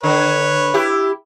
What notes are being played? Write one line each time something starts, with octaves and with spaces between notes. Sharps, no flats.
D3 B4 C#5
E4 G4